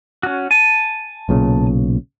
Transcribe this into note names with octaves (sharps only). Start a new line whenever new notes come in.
C#4 F#4
G#5 A5
B1 A#2 C#3